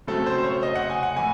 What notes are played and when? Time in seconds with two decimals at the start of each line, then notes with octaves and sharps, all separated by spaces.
0.07 C#3 F#3 A3 C4 A4
0.26 C5
0.38 C5
0.44 C#5
0.63 D#5
0.76 F#5
0.90 G#5
1.03 F#5
1.16 A2 E3 G#5